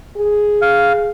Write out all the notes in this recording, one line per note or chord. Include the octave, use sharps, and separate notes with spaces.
G#4
F5